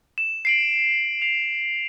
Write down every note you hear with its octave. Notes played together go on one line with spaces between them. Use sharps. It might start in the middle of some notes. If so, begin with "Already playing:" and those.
E7
C7 D7 F#7
C7 F7